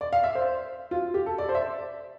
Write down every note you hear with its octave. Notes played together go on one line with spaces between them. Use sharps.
D5
F5
E5
C5
F4
G4
A4
D5
C5
E5